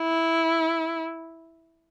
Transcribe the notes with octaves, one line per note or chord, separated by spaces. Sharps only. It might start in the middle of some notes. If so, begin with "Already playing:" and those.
Already playing: E4